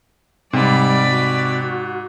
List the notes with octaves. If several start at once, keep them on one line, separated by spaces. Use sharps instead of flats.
G#2 C3 G3 D5 B5
F#4